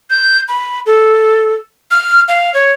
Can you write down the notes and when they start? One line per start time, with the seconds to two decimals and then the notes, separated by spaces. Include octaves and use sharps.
0.10 G6
0.48 B5
0.86 A4
1.91 F6
2.28 F5
2.54 C#5